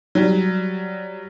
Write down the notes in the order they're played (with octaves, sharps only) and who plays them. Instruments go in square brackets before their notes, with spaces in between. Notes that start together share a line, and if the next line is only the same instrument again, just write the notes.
[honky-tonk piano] F#3 G3